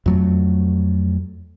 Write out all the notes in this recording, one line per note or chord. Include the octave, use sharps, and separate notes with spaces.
F2 F#3 A3